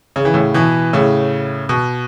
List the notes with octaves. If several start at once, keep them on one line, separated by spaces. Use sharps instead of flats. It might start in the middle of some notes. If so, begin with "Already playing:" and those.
C#3
E3
A2 C#3
B2 E3
A2 C#3
B2